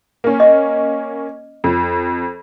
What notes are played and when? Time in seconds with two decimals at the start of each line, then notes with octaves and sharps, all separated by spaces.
0.24 A#3 C#4
0.40 D#5
1.64 F2